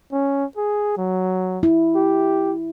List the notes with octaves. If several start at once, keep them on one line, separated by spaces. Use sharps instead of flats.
C#4
G#4
F#3
E4
G4